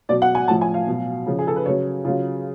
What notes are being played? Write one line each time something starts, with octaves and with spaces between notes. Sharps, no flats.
B2 F#3 D5
F#5
G#5
A2 F3 A5
G#5
F5
B2 F#3
C#3 F3
G#4
A4
B4
C#3 F#3 C#5
C#3 F#3 F4